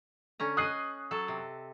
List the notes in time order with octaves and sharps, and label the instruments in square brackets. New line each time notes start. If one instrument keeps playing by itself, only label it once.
[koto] D3 C#4 A#5
[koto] D#5 G#5 [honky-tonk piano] D#6 F#6 C7
[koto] F#3 A4 A5
C3